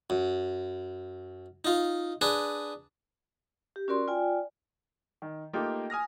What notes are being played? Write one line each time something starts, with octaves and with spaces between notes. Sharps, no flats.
F#2
D#4 F4
D4 G#4 B4
G4
C#4 F#4 A#4 D5 C6
F4 D5 G5 G#5
D#3
A3 A#3 D#4 F4 G4 G5
G#5 D#6 F6 A#6